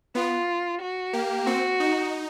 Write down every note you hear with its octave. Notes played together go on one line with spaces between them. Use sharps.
B3 F4
F#4
A#3 G4
C4 F#4
D#4